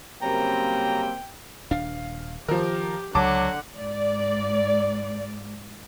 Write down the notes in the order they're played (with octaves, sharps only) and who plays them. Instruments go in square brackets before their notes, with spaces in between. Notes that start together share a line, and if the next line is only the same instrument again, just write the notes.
[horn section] F#2 C#3 G3 [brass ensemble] A#3 C4 [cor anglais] G5 [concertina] A#5
[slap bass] D#1 D4 [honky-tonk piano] F5
[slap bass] D#3 [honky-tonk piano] F3 A#4 [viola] G4
[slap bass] C#2 [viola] D3 F#5 [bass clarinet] F#3 [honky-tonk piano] A5 D6
[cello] G#2 [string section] D5